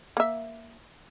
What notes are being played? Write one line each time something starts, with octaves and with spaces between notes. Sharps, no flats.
A#3 E5